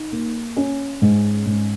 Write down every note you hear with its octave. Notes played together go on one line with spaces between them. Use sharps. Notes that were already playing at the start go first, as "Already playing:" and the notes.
Already playing: D#4
A#3
C#4
G#2
G#2